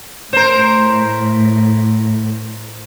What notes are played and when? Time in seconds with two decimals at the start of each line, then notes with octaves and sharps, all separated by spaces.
0.33 A2 A#4 C5